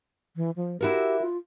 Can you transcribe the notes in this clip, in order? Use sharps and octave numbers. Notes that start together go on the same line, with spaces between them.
E3
F3
E4 F#4 G4 A#4
F4